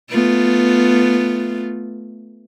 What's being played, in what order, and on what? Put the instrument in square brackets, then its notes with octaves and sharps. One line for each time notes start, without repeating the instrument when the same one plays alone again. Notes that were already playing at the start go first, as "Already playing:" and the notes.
[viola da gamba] A3 B3 F4